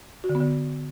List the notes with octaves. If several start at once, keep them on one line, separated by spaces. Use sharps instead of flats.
F#4
D3
B3
D3